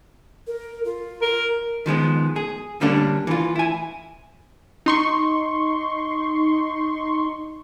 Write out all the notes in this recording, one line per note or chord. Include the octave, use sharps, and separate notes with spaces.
A#4
F4
A#4
D#3 F3 G#3 B3
G#4
D3 G3 A#3 C#4 D4
E3 F4
E4 G#5
D#4 C6 C#6